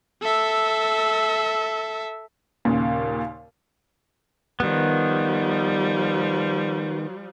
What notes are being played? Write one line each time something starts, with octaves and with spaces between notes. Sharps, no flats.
A4 E5
D#2 A#2 C#3
D#3 F3 G3 B3